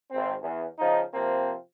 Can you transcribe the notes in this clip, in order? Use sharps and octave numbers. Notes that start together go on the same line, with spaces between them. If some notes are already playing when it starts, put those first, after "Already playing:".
G#1 C4
E2
C#3 F3 D#4
C3 F3 A#3 C4